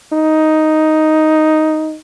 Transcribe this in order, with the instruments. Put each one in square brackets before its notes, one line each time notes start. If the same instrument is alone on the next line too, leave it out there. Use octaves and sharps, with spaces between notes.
[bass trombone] D#4